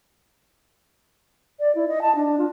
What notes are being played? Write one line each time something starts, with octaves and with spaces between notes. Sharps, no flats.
D5
E4
D#5
A5
D4
F4